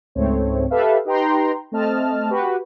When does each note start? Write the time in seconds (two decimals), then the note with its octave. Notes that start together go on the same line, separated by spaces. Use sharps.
0.15 C#2 G#2 A3 C4 C#5
0.70 G4 A4 B4 E5 F5
1.05 D#4 G4 B4 G5 A#5 C6
1.72 A3 C4 D#5 A5 F6
2.29 F#4 G4 B4